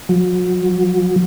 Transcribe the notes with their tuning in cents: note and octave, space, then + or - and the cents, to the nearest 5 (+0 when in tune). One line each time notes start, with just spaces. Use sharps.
F#3 -40